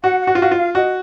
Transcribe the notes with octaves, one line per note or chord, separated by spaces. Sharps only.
F#4 F#5
F#5
F#4
F4
F#4 F5
F4
F5
F#4 D#5